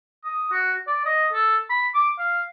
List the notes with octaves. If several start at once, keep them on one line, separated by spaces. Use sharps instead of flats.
D#6
F#4
D5
D#5
A4
B5
D6
F5